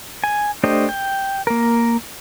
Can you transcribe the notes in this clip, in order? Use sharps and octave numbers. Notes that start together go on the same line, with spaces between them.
G#5
A3 D4 G4 C5 D#5
G5
A#3 A#4